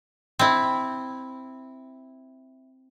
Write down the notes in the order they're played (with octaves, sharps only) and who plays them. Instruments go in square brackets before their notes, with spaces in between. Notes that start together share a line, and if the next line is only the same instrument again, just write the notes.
[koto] C4 E4